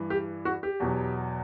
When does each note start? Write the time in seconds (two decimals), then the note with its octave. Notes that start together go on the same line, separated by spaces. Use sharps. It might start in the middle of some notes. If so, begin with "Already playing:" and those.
Already playing: G2 E3
0.10 G4
0.45 F#4
0.63 G4
0.80 E2 B2 F#3